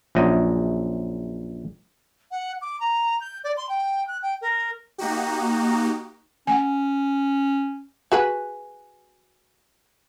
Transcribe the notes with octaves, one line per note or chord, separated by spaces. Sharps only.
A#1 F#2 D#5
F#5
D6
A#5
G6
D5
C6
G5
F#6
G5
A#4
A#3 D#4 F#4 G4
C#4 F#5 G#5
F#4 G#4 B4